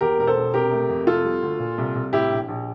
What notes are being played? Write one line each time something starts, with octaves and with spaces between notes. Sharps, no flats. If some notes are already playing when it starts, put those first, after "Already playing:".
E2 G4 A#4
E1 A#4
A4 C5
E1
C3 G4 A#4
A3
F2
C3 F4 A4
G3
D2
A#2
C2
C2
A2 E4 G4
A#1
A#1